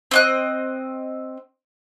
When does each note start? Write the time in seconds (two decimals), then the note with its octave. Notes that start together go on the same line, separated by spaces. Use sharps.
0.11 C4 D#5 F#6